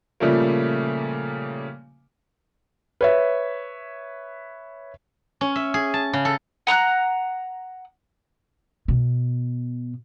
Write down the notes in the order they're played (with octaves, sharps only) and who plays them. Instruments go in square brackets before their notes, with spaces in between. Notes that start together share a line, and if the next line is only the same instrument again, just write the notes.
[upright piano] A#2 C#3 F3 G3 A3 A#3
[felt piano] B4 C#5 E5
[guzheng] C#4
E5
G#4
A5
C#3
A4
[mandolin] F#5 A#5 D#6 F#6
[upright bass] B2